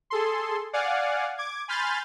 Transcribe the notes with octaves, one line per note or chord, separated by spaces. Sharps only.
G#4 A4 C6
D5 F5 F#5 G#5
D6 G#6
G#5 B5 C6 F6 G6 A6